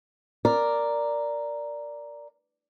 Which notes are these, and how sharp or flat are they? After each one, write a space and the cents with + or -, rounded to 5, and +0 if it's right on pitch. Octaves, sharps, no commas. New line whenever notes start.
A#4 +0 D5 +0